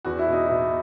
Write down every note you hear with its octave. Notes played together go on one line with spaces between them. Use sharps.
E2 F#4
E4
B2
D#4
B2 E4